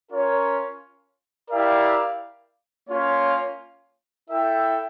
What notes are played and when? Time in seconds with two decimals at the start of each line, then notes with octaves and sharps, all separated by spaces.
0.10 C#4 F4 A#4 C#5
1.49 E4 G4 A#4 D5 F5
2.88 A#3 C#4 F4 C#5
4.28 E4 A4 E5 G5